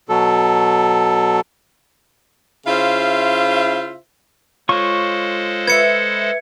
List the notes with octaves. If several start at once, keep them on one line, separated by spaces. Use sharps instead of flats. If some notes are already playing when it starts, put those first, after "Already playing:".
B2 F#3 A4
C#3 E4 F4 C5 E5 F5
G#3 F4 A4 C5 C#5 C#6
B4 E5 G#6 C#7